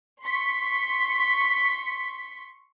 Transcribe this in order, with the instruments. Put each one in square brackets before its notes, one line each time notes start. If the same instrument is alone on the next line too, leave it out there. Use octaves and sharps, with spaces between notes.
[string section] C6 C#6 B6